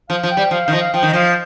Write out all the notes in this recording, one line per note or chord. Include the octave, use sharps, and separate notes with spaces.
F3 F5
F3
G5
G3
F3 F5
D#3 F5
F3 D#5
F5
F3 G5
D#3
D#5
F3 F5